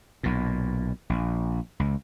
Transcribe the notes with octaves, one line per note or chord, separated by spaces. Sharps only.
B1 A#2
A#1
C#2